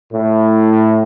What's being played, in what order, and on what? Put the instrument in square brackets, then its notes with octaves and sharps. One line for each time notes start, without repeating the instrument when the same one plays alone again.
[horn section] A2